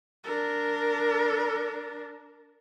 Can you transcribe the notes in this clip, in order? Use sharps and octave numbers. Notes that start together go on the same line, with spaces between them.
D4 A#4